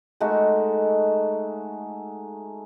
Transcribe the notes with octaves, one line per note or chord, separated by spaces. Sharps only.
G#3 A3 D#4 F#4